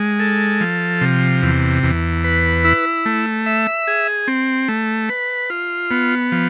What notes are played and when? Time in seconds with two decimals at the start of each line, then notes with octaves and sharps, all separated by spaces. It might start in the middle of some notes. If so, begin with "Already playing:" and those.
Already playing: G#3
0.20 A4
0.61 F3
1.01 C3
1.42 E2
1.83 E2
2.24 B4
2.65 E4
3.06 A3
3.46 E5
3.87 G#4
4.28 C4
4.68 A3
5.09 B4
5.50 F4
5.91 B3
6.32 F3